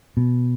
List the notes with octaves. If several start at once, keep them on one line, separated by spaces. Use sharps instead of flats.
B2